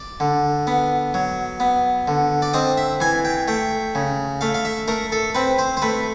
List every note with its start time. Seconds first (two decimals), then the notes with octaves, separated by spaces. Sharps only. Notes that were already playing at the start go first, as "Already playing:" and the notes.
Already playing: D5
0.20 D3
0.67 B3
1.14 F#3
1.60 B3
2.08 D3
2.42 D5
2.54 C4 D#5
2.77 E5
3.00 E3 G#5
3.25 G5
3.48 A3 G5
3.95 C#3
4.41 A3 F5
4.54 F5
4.65 E5
4.88 A3 A#4
5.12 A4
5.35 C4 B4
5.59 C5
5.77 C5
5.82 A3 B4